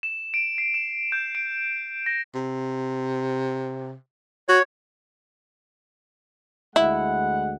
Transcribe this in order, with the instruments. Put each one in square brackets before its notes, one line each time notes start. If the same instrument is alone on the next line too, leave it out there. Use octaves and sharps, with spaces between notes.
[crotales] E7
D7
C7
E7
G6
D7
A#6
[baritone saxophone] C3
[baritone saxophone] F#4 [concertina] C#5
[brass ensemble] D2 G#3 F#5 [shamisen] E4